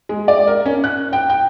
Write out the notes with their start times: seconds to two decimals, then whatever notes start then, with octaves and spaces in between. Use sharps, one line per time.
0.09 G#3
0.28 D5
0.47 A#4
0.66 C#4
0.84 F#6
1.13 G5
1.29 G5